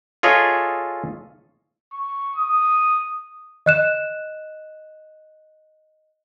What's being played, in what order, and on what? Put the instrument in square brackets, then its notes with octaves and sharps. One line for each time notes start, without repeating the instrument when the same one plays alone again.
[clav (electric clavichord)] F4 G#4 A4 C#5 D#5 E5
[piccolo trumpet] C#6
D#6
[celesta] D#5 F#6 E7